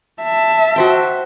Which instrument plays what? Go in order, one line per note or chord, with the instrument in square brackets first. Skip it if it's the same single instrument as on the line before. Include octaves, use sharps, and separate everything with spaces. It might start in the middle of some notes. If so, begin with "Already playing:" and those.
[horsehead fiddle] E5 A5
[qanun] F#4 C5 G5